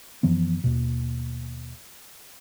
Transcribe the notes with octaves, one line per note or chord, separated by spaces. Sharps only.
F#2 E3 F3 B3
D#2 B2